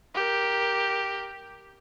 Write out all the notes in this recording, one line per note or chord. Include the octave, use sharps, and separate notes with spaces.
G4 A#4